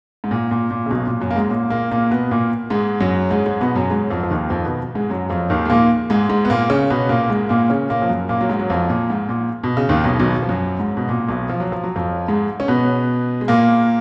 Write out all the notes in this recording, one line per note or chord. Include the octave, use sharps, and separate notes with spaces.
G#2
A#2
A#2
A#2
C#3
B1 B2
A#2
F#2 F#3
A#3
G#2 G#3
A#2 A#3
A#2 A#3
A#2 A#3
B2 B3
A#2 A#3
G#2 G#3
F#2 F#3
G#2 G#3
G#2 G#3
B2 B3
F#2 F#3
G#2 G#3
F2 F3
F3
D#2 D#3
F2 F3
B2 B3
G#2 G#3
F#2 F#3
F2 F3
D#2 D#3
G#3
A#2 A#3
G#2 G#3
G#2 G#3
B3
A#2 A#3
C#3 C#4
B2 B3
A#2 A#3
G#2 G#3
A#2 A#3
C#3 C#4
A#2 A#3
F3
F#2 F#3
A#2 A#3
F#3
G#2 G#3
F#3
F2 F3
A#2
G#2
A#2
B2
C#3
D#2 D#3
B1 B2
B1 B2
F3
F#2 F#3
G#2
B2
A#2
B1 B2
F3
F#3
F3
F#3
F2 F3
G#2 G#3
C#4
B2 B3
G#3
A#2 A#3